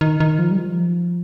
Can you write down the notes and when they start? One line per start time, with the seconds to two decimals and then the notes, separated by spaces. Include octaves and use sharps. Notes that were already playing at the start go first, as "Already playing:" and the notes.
0.01 D#3
0.20 D#3
0.39 F3
0.51 G3
0.58 F3